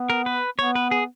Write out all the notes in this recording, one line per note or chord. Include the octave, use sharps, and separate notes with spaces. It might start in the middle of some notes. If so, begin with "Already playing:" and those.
Already playing: B3
A#4
B4
B3 C#5
B4
G#4